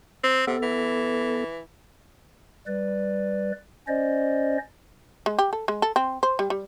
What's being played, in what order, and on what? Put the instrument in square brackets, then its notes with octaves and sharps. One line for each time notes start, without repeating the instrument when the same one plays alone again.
[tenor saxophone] C4
[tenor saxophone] C3 [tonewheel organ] B3 A4
[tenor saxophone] E3
[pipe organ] G3 B4 D5
C#4 C5 D5 D#5
[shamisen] G#3
G4
A4
G#3
A4
C4
C5
G3
G3